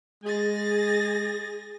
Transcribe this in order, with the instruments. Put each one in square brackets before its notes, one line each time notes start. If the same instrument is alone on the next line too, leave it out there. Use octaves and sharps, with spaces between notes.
[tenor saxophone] G#3 [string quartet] G#4 A6 A#6